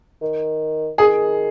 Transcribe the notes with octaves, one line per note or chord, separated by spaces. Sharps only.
D#3
D#3 G#4